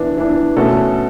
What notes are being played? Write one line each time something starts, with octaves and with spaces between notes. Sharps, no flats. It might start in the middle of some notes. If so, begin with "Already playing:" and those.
Already playing: E3 B3 D4
E3 B3 D4
B2 A3 C#4 F#4 A4